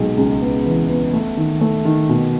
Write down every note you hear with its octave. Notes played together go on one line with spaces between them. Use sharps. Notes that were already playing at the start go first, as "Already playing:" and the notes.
Already playing: B1 G#3
C#2
B3
E3
B3
A3
D#3
A3
D#3
B2